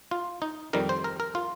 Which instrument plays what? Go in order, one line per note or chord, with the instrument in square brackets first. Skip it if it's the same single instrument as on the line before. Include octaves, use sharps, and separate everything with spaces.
[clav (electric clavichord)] F4
D#4
F2 D#3 G3 A#4
C5
A#4
A#4
F4